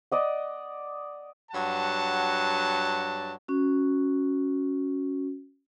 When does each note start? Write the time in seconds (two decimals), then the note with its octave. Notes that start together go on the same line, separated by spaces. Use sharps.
0.12 D5 D#5 F#5
1.51 G2 F#3 F#5 A5
3.48 C#4 F#4